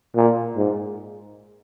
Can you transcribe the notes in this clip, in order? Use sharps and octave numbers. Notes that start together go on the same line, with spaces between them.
A#2
G#2